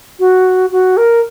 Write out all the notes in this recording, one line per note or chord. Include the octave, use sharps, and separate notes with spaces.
F#4
F#4
A#4